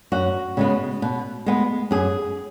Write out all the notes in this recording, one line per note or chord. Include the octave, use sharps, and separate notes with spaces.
F#2 F#4
C#3 G#3 B3
B2
G#3 B3
F#2 G#4